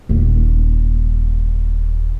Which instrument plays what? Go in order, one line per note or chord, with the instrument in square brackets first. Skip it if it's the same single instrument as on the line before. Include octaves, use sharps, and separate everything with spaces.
[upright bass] D#1 A#3